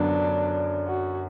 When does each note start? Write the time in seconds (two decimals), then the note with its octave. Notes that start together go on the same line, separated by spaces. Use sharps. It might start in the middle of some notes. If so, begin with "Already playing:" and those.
Already playing: F#2 D3 F#3 B3 D4
0.87 F#4